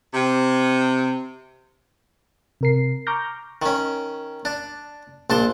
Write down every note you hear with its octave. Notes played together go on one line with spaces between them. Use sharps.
C3
C3 A#4 C7
A#5 C#6 D6 F6 G6 A#6
D#3 C#4
D4
A#1 D4 A5 C6